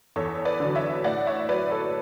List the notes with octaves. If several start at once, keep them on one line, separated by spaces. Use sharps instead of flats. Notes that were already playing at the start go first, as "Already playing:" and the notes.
E2 A4 C#5
B4 D5
D3 F#3
C#5 E5
A2 D5 F#5
C#5 E5
F#3 B4 D5
A4 C#5